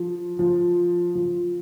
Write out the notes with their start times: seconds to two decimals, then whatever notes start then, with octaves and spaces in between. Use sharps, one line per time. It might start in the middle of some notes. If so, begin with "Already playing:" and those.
Already playing: F3
0.39 F3
1.15 F3